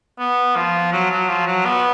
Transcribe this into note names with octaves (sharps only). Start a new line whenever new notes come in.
B3
F3
F#3
F#3
F3
F#3
B3